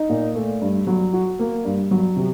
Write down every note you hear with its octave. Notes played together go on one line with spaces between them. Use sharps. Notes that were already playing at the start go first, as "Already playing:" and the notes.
Already playing: D#4
A#2
A3
G2
F#3
F#4
A#3
G2
F#3
C3